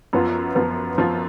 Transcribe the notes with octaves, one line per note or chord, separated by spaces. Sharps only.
F#2 F3 B3 F4
F#2 F3 B3 F4
F#2 F3 B3 F4